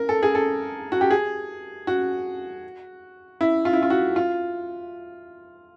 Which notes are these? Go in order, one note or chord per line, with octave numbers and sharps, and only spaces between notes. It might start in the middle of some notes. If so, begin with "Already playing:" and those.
Already playing: A#4
A4
G#4
A4
F#4
G4
G#4
F#4
E4
F4
E4
F4
F#4
F4